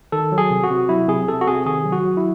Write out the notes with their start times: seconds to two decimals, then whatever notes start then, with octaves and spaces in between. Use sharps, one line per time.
0.12 D#3 A4
0.32 F#3
0.38 G#4
0.50 C3
0.64 F#4
0.71 C3
0.89 F#3 E4
1.08 C3 G#4
1.28 C3 A4
1.41 F#4
1.47 C3 G#4
1.66 D#3 G#4
1.85 F#3
1.92 F#4
2.05 F#3
2.17 E4